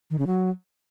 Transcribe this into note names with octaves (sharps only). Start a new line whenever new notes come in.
D#3
C#3
F#3